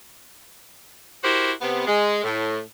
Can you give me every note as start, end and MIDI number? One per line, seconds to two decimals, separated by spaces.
1.24 1.52 64
1.24 1.52 66
1.24 1.52 67
1.24 1.52 70
1.24 1.52 72
1.61 1.84 48
1.61 1.84 59
1.87 2.22 56
2.23 2.59 45